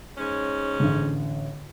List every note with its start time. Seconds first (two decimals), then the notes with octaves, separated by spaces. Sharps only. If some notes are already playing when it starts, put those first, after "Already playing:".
0.17 G#2 C#4
0.80 A1 D3